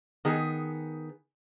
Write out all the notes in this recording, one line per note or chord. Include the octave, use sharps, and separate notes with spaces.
D#3 B3 G#4